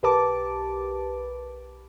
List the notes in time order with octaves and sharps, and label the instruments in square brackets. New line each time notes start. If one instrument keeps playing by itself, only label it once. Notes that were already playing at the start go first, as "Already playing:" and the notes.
[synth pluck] B1 G4 A#4 B4 A5 D6